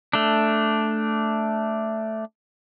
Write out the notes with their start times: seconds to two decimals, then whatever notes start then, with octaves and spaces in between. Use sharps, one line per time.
0.13 A3 D4